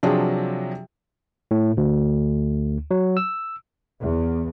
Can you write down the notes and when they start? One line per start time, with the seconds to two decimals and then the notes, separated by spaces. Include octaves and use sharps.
0.03 C3 F3 F#3 D4 F4 G#4
1.51 A2
1.77 D2
2.91 F#3
3.17 E6
4.03 E2